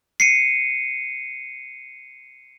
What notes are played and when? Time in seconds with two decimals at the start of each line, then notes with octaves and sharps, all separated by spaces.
0.20 C7 C#7 D#7